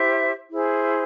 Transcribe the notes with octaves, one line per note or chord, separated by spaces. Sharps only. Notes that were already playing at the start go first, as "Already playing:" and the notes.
Already playing: E4 G4 C5 E5
E4 G#4 C5